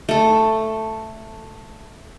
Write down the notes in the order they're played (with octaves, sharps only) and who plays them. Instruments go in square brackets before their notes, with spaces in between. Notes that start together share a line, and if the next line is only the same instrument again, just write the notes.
[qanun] A3 A4